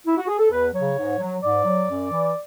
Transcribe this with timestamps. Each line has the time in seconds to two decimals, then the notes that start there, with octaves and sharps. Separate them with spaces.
0.06 E4
0.17 F#4
0.28 G#4
0.39 A4
0.50 E2 B4
0.73 C#3 F#3 C#5
0.96 G#2
1.19 F#3
1.42 G#2 D5
1.65 F#3
1.88 F#2
2.11 E3